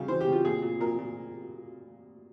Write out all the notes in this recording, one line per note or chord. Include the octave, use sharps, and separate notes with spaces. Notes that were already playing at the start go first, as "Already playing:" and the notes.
Already playing: C#3 G3 F5
E3 C5
G4
C#3
F4
A#2 G#4
A#2
A#2 A#4
A#2